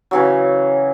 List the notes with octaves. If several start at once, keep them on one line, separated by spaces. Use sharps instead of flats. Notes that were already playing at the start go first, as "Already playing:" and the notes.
C#3 E3 F#3